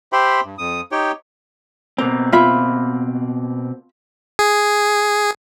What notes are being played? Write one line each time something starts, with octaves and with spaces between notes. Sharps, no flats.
G4 C5 E5 G5 B5 C6
G2
F2 D#6
D#4 G4 C#5 G5
B2 A#3 C4 A#5
F4 E5 B5
G#4